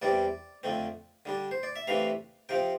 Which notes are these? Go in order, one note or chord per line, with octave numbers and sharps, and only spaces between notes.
E2 C3 G3 C4 D5
F2 D3 A3 C4
D3 G3 D4
C5
D5
E5
C3 E3 A3 D4 F5
C3 F3 C4 G5